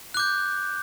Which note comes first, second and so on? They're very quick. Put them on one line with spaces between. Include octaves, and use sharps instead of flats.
F#6 D6 G6